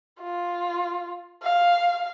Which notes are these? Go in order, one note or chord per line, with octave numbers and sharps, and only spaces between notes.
F4
F5